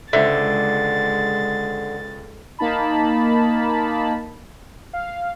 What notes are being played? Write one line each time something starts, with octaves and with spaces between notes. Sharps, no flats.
C#2 D3 G#3 C5 D5 E5 A6
A#3 D#4 A5 B5
F5